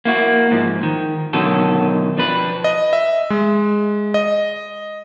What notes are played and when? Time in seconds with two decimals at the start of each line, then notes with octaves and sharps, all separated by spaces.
0.05 A#3 E4 F#4
0.51 G#2 F3
0.83 D#3
1.33 B2 D3 D#3 F#3 A4
2.17 F3 D4 B4
2.64 D#5
2.93 E5
3.30 G#3
4.14 D#5